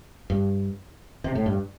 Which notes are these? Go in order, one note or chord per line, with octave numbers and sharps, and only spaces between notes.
G2
C3
A2
G2